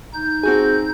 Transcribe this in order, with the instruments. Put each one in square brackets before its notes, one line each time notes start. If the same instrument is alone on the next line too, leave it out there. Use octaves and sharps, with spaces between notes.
[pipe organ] D#4 G6
[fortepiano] C4 F#4 G#5 [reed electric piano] G#4